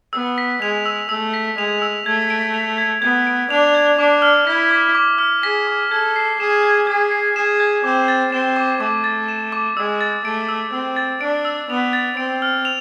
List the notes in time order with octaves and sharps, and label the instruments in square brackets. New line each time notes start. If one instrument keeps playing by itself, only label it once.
[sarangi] B3 [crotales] E6
[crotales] B6
[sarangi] G#3 [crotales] F7
[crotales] E6
[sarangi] A3 [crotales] E6
[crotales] B6
[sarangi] G#3 [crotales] F7
[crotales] E6
[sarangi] A3 [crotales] G#6
[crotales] D7
F7
G#6
[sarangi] B3 [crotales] G#6
[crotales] D7
[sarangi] D4 [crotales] F7
[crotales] G#6
[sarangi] D4 [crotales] D6
[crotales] F6
[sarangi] E4 [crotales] B6
[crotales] D6
D6
F6
[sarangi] G#4 [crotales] B6
[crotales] D6
[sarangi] A4 [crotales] G#6
[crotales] C7
[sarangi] G#4 [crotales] E7
[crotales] G#6
[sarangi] G#4 [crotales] G#6
[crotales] C7
[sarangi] G#4 [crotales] E7
[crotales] G#6
[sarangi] C4 [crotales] D6
[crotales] A6
[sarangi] C4 [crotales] E7
[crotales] D6
[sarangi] A3 [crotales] D6
[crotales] A6
E7
D6
[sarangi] G#3 [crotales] E6
[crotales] A6
[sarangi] A3 [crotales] D7
[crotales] E6
[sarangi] C4 [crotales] E6
[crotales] A6
[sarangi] D4 [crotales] D7
[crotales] E6
[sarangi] B3 [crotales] F7
[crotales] A6
[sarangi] C4 [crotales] D7
[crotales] F6
F7